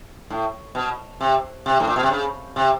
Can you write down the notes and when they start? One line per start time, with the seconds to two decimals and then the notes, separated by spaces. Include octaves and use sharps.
0.30 A2
0.75 B2
1.21 C3
1.66 C3
1.80 A2
1.87 A#2
1.96 B2
2.03 C3
2.10 C#3
2.56 C3